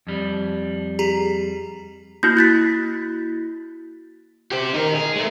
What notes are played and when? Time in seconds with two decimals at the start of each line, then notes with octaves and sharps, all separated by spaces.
0.07 F2 G3
0.99 G4 G#4 A#5
2.23 A#3 E4 F#4 G6
2.37 F#6 A6 B6
4.52 G4 C5
4.74 D#4 A#4
4.95 G#4
5.16 G#3 A3